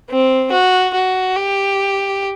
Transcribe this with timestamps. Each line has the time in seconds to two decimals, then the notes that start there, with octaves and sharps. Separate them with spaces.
0.10 C4
0.52 F#4
0.94 F#4
1.36 G4